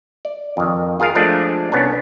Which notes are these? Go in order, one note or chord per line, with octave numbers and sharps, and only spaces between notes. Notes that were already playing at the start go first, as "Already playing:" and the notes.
D5
F2 D#3
F4 G#4 A#4 F5
F3 G#3 A3 D4 D5
C2 B3 C#4 D4